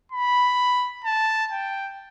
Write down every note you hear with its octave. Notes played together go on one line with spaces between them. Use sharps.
B5
A5
G5